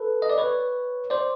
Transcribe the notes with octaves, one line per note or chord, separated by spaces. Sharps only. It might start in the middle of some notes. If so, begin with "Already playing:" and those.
Already playing: A4 B4
D#5
D5
B4 C#5
C5 D5